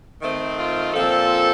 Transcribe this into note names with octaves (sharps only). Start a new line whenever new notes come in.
D#3 A3 C4
F4
A#2 F3 C4 A4